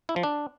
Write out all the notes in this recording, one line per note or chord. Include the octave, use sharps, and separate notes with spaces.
E4
F3
D4